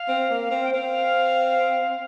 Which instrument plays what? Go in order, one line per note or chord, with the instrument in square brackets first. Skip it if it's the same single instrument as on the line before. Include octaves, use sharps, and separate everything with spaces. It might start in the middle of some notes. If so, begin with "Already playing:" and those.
Already playing: [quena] F5
[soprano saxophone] C4
A#3
C4
[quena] G5
[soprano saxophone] C4 [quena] F5